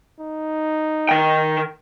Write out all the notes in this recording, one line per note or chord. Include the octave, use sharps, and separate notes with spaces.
D#4
D#3 G5